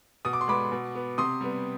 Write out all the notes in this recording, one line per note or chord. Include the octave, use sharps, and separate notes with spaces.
B2 D#6
D6
C6
G#3 B3 B5 D6
B2
B3
C3 C6 D#6
G3 B3